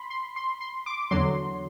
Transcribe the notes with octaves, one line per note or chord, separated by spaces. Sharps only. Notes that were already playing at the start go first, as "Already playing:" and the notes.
Already playing: B5 C6
C6
C6
C6
D6
E2 D3 F#3 C6